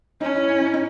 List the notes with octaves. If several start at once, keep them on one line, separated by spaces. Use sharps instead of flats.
C#4 D#4
E4
E4
D#4
D#4